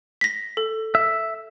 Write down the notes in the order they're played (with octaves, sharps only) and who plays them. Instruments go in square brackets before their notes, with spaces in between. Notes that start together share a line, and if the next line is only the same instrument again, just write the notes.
[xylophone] A#6 B6
A4
[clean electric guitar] E5